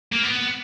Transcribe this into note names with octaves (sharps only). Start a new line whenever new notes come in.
A#3
B3